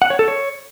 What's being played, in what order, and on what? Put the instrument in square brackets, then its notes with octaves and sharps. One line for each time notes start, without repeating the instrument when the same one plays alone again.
[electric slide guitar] F#5
C#5
A4
C#5